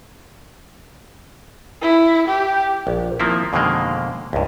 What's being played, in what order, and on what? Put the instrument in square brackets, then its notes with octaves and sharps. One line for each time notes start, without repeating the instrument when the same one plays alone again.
[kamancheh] E4
G4
[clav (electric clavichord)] A#1
D#3 F3 A#3 C4 E4
F2 B2 D3 D#3 G#3 A#3
C#2 G2